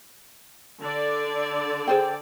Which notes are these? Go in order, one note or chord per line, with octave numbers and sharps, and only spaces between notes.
D3 D5
G#4 C5 G5